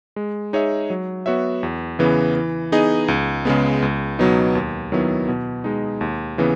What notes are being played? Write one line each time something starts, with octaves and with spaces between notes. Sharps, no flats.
G#3
D#4 G#4 C#5 E5
F#3
B3 F#4 C#5 E5
E2
C#3 E3 B3
E3
B3 D#4 G#4 D#5
C#2
C#3 G#3 B3
C#2
B2 F#3 B3 D#4
D#2
D#3 F#3 B3 E4
B2
G#3 D#4
D#2
C#3 E3 B3